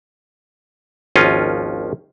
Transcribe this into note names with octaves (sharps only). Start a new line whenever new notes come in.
G#1 D#2 F3 C#4 F4 D#5